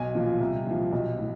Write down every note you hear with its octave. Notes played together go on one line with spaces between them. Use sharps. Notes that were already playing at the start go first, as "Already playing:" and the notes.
Already playing: B1 G#5
A#2 F3
C2
A#2 F3
B1
A2